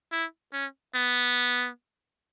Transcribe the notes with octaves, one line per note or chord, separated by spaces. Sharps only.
E4
C#4
B3